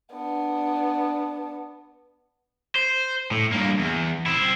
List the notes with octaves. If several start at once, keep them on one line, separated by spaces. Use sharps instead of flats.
B3 D4
C5
A2
G2 A#3
E2
C4 E4